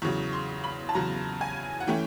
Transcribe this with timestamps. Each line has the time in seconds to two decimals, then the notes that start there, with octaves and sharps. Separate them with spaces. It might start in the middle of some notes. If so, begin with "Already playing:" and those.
0.02 E2 C#3 F#3 C#6
0.33 C6
0.64 B5
0.89 A5
0.95 E2 C#3 F#3 A#5
1.41 G#5
1.80 F#5
1.88 E3 A3 C#4 G5